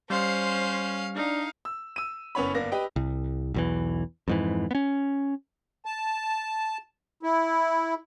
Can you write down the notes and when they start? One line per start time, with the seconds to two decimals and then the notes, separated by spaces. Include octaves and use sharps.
0.10 G3 C#4 C5 F5 C6
1.15 D4 D#4 F5
1.65 E6
1.96 E6 D#7
2.35 F#1 B3 C#4 C#5 B5
2.54 G1 A#3 B3 D5 A#6
2.72 G4 B4 D#5 G5
2.96 C2
3.54 B1 E2 E3
4.28 F2 G#2 E3
4.71 B3 C#4
5.85 A5
7.23 E4